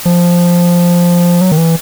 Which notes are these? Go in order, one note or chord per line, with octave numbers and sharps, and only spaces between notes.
F3
F#3
D#3
E3